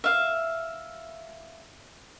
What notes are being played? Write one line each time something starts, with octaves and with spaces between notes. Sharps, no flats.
E5 F5